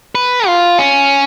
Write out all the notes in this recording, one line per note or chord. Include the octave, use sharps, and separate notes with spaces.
B4
F4
C#4